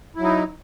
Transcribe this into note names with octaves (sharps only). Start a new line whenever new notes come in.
F#3 D#4 E4